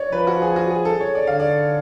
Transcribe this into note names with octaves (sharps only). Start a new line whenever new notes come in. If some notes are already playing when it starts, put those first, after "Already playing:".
Already playing: C#5 D5
F3 B4
F#4
G#4
F#4
G#4
A4
C#5
D5
D3 F5
D5